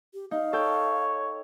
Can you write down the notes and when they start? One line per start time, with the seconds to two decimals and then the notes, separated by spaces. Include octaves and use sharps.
0.14 G4
0.31 D#4 F5
0.53 A4 C#5 G5